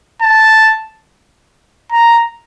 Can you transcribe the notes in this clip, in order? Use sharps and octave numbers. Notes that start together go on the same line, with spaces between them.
A5
A#5